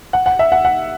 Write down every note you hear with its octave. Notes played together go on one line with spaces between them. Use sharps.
F#5
F#5
E5
F#5
F#5